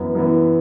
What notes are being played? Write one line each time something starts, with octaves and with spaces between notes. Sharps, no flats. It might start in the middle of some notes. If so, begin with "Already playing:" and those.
Already playing: F#2 E3 B3
F#2 E3 B3